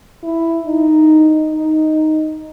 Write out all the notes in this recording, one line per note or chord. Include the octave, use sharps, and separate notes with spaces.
E4
D#4
D#4